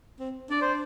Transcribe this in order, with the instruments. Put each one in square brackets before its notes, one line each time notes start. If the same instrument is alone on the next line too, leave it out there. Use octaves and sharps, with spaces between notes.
[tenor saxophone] C4
[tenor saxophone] D4 [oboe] D5
[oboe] C5